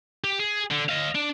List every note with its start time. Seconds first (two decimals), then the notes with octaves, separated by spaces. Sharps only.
0.24 G4
0.39 G#4
0.70 D3
0.89 D#5 F5
1.15 D4